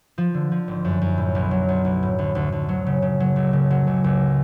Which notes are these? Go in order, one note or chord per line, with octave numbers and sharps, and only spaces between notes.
F3
D3
F3
G#1
F#2
F#2
A2
B1
F#3
B1
B1
A2
D2
D2
D2
F#3
C#3
C#3
F#3
C#2
C#3
F#3
C#2
C#2